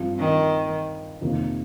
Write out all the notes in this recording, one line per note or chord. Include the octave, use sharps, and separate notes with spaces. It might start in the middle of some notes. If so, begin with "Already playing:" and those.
Already playing: G2 F3 C4
D#3
F2 C3 D#3 A#3